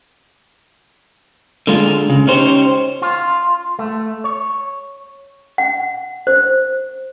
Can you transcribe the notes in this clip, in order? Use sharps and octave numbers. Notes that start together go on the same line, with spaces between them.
D3 G#3 F4
C#3
C#4 D#4 G4 C5 C#5
F4
A3
C#5
F#5
C5